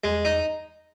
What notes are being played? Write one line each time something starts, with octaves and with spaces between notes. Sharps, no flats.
E2 G#3
D#4